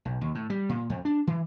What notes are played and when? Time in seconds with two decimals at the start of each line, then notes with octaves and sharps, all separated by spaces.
0.05 B1
0.21 D#2
0.35 A2
0.50 G3
0.69 A#2
0.90 F2
1.05 D4
1.27 E3